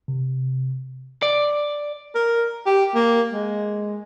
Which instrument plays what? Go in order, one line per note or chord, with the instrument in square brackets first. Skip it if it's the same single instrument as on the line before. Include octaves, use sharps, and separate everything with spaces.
[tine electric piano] C3
[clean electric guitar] D5
[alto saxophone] A#4
G4
A#3
G#3